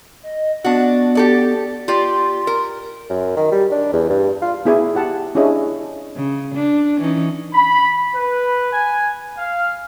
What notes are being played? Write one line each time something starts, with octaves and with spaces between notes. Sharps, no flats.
D#5
B3 D4 F#4
G4 A4 D5
F4 G4 D5 C6
A#4
F#2
D#3
G3
D4
E2
G2
F4
B3 E4 G#4 D5 G#5
G4 F#5 A5
C#4 D4 E4 G#4 D#5
C#3
D4
E3 C#4 D#4
B5
B4
G#5
F5